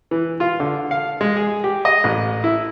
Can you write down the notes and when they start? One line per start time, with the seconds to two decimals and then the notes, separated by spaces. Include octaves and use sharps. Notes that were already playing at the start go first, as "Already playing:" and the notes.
0.11 E3
0.40 F4
0.60 D3
0.91 F5
1.21 G#3
1.37 G#4
1.64 G4
1.85 D#5
2.04 A1
2.44 E4